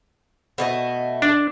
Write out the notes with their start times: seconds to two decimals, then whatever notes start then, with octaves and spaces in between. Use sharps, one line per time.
0.58 B2 A3 D#5
1.22 D4